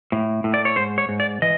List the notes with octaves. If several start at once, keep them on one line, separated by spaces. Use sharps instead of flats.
A2
A2
D5
C#5
G#2 C5
C#5
G#2
D5
E3 D#5